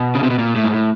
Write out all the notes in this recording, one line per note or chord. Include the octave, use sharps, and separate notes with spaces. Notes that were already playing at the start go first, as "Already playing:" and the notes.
Already playing: B2
C#3
C3
B2
A#2
A2
G#2
A2